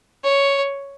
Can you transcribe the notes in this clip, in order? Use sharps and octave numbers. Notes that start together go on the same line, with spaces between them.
C#5